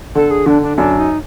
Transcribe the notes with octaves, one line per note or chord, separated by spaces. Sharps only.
D3 A4
G#4
D3 D4
D4
F#2 D4
D#4